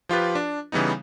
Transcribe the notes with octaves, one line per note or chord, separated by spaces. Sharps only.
F3 F4 G4 B4
D4
C#3 E3 G3 B3 D#4